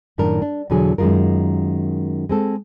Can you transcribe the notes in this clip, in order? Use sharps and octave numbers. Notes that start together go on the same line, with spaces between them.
F#2 A2 D#3 D4 A#4
D4
E2 B2 D3 F#3 G#4
F#2 D#3 G#3 F4 A#4
G#3 C4 A4